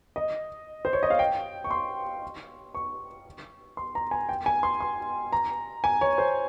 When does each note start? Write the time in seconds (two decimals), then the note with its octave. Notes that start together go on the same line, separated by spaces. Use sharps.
0.16 D#5
0.85 C5
0.93 C#5
1.03 D#5
1.10 F5
1.19 G5
1.64 C#6
1.71 C6
2.75 C#6
3.77 C6
3.95 A#5
4.11 G#5
4.29 G5
4.46 G#5
4.63 C6
4.81 C6
5.33 A#5
5.84 G#5
6.01 C#5
6.18 C5